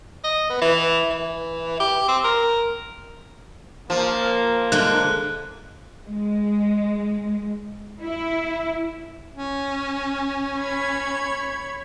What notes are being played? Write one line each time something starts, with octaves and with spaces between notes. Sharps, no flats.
D#5
B3
E3
E3
G4
C4
A#4
F3 A#3
D3 G#3 F#6
G#3
E4
C#4
C#5 B5 G#6